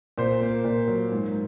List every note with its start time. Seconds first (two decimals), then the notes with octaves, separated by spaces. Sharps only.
0.18 A#2 C5
0.41 A#3
0.64 A#2
0.88 F#3
1.11 G#2